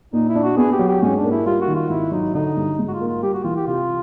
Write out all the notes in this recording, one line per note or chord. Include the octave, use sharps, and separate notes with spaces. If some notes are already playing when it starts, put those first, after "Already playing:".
A#2 D#4
E4
D4
F#4
B3 G#4
G4
F#3
G4
G#2 C#4
D4
A#3
E4
G3 F4
F#4
D#3
F4
G#1 E4
F#3 D#4
D3 D#4
G2
G#2
F#4
F4
A#3
F4
G3 G4
F#4
E3 F4
G4
C3 F4